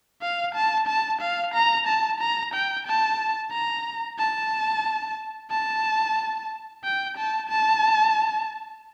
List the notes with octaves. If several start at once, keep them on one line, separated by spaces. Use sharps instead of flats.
F5
A5
A5
F5
A#5
A5
A#5
G5
A5
A#5
A5
A5
G5
A5
A5